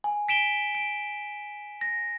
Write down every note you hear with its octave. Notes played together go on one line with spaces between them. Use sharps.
G#5
B6 D7 E7 G7
D7
A#6